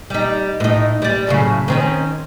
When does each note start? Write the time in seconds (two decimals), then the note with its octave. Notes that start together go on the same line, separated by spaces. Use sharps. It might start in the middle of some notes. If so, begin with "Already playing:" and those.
0.10 G3 D#4
0.60 A2 D#4
1.02 G3 D5
1.27 F#2 A2 C#3
1.68 D#3 C4 C#4